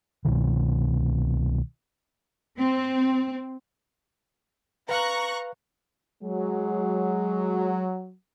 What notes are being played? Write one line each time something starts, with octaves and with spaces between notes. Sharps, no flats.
C2 B2 D#3
C4
B4 F5 A#5 C#6 F#6
F#3 G#3